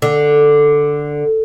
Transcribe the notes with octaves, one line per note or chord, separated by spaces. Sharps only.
D3